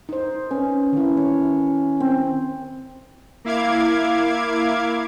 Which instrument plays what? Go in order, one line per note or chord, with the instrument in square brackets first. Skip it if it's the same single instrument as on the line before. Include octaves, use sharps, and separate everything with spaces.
[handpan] D#4 C5
[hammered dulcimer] C#4 [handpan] B4
[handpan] D#3 E4
[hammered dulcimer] C#5
C4
[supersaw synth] A#3 E4 F5 D6 G#6